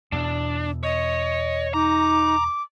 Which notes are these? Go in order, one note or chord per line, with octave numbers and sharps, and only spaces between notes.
E2 B2 D4
C#5 D#5
D#4 A#5 D6